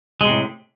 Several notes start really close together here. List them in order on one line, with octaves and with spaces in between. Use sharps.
G#3 C3 A2